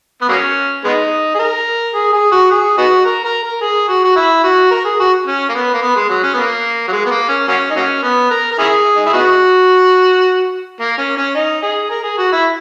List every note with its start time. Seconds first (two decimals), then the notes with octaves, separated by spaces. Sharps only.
0.22 B3
0.29 F#3 A#3 C#4
0.84 G#3 B3 D#4
1.35 G#4
1.39 A#4
1.94 G#4
2.13 G#4
2.32 F#4
2.51 G#4
2.78 B3 D#4 F#4
3.05 A#4
3.25 A#4
3.43 A#4
3.61 G#4
3.89 F#4
4.04 F#4
4.16 E4
4.44 F#4
4.71 A#4
4.85 G#4
5.00 F#4
5.26 C#4
5.49 A#3
5.54 B3
5.74 A#3
5.82 B3
5.96 G#3
6.09 F#3
6.23 C#4
6.34 B3
6.37 A#3
6.88 F#3
6.92 G#3
7.06 B3
7.11 A#3
7.29 C#4
7.48 F#3 A#3 C#4
7.70 D#4
7.76 F#3 A#3 C#4
8.03 B3
8.31 A#4
8.52 A#4
8.59 C#4 E4 G#4
8.96 D#4
9.06 E4
9.14 B3 D#4 F#4
10.81 A#3
10.98 C#4
11.17 C#4
11.35 D#4
11.63 G#4
11.90 A#4
12.04 G#4
12.18 F#4
12.33 E4